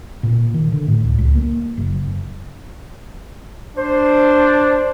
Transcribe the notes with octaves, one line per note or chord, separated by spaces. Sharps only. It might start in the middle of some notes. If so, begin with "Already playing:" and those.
A#2
D#3
D3
A2
C#2
C#2
A#3
F#1
D4 C5